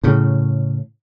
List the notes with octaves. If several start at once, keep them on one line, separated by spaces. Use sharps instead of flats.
A2 C#3